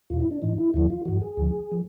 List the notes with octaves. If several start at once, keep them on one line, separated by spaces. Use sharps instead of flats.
E2 B2 F4
E4
D4
A2 E3 D#4
E4
D#2 D3 F3 E4
F4
G2 E3 F#4
G#4
D2 D3 F3
F3